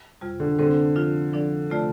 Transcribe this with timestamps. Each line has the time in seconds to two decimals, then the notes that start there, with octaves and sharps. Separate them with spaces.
0.21 F2 C3 G3 F4
0.40 D3
0.58 D3 G3 C4 A4 C5
0.96 F3 D4 F4
1.33 F3 D4 A4 D5
1.70 C3 A3 F4 D5